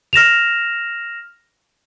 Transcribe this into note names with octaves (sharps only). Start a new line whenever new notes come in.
F6 A#6 E7 F7